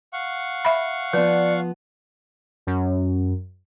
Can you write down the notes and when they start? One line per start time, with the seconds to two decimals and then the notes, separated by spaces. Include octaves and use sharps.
0.13 F5 F#5 C#6
0.65 E5 B5
1.13 F3 B3 B4 D5
2.67 F#2